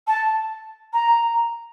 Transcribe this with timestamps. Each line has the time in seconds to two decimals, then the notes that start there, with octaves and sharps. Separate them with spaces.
0.07 A5
0.93 A#5